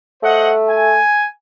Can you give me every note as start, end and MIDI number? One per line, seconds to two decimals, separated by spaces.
0.23 0.98 57
0.23 0.51 72
0.23 0.51 75
0.23 0.51 78
0.69 1.27 80